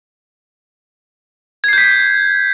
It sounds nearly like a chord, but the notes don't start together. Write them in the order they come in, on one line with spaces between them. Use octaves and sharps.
G#6 C7 G6 B6